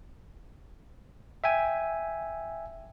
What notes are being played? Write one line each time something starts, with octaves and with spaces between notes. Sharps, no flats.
E5 G5 G#5